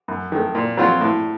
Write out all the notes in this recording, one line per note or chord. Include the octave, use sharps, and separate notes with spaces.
F#2
D#3 A3
A#2
F#3 C4 F4
A2